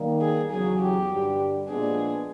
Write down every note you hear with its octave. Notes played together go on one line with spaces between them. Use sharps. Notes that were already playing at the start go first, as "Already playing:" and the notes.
Already playing: D#3 G3 A#3 D#4
G#4
E2 C#3 F#3 G#4
G4
G2 D3 G3
A#2 F3 G#3 B3 D4 G#4